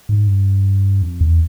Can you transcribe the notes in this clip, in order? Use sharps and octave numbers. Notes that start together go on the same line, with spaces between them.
G#2
G2
F2
E2